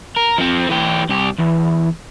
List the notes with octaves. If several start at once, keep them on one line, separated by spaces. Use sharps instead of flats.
A#4
F3 C4
E3 G4
C2 G4
E2